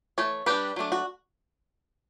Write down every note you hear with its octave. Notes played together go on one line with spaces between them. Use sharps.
E3 A3 C#5
G3 D4 G4 B4
F#3 A3 D4
F#4